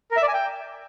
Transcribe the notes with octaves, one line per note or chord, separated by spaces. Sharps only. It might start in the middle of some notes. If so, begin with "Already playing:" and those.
A#4
E5
D5
G#5
G5